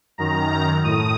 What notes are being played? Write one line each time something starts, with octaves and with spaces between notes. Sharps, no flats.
F#2 D#3 A#5
A2 D#6